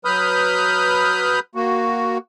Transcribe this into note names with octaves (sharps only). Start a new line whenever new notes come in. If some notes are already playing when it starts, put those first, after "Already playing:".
F#3 B4 B5 D#6 F6 G6
A#3 F#4